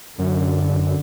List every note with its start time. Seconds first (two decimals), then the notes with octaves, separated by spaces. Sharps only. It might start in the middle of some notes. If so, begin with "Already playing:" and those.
0.19 F#2 D3
0.70 G2
0.75 F#2